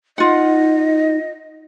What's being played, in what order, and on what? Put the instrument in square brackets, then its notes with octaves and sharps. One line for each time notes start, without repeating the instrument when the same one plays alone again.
[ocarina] D#4 [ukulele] F4 F#5 [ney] D#5